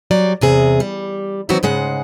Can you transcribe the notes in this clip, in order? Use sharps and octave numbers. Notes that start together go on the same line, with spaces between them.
F#3 G3 D5
E2 C3 G#4
G3
D#3 E3 F#3 C4 F#4
G#2 C#3 G#3 F#5